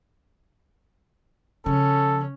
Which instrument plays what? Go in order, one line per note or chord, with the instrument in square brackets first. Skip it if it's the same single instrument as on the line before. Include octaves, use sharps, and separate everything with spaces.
[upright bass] C#3 F3 [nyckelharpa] C#4 [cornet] A4